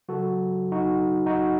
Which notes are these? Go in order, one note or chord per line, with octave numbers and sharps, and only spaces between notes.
C#3 F#3 F#4 A4
D#4 F#4
D#4 F#4